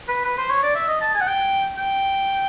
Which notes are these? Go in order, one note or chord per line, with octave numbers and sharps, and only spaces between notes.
B4
B4
C5
C#5
D5
E5
D#5
A5
G#5
F#5
G5
G5